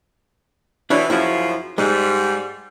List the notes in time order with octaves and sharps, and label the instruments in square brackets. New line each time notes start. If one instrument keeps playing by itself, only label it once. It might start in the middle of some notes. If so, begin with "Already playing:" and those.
[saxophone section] B2 E3 [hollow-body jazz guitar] D4 E4 C#5
[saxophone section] F#2 C#3 F3 [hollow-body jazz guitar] E4 F#4
[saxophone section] G#2 G3 [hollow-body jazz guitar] G#3